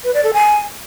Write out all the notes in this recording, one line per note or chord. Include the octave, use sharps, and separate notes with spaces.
B4
D5
A4
G#5